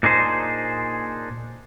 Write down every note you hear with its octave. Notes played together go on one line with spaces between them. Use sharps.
A#2 D4 D#4 G#4 C5